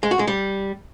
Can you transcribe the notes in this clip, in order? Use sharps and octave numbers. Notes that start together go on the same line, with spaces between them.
G#3
F#4
G#3
G3